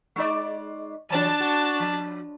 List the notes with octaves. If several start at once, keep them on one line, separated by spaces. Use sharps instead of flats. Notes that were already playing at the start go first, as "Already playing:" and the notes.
G#3 D#4 D5
C#3 E3 F#3 D4 A5
F#4
F3